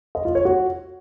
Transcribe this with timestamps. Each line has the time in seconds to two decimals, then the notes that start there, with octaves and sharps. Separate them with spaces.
0.15 D#5
0.25 F4
0.35 C#5
0.45 F#4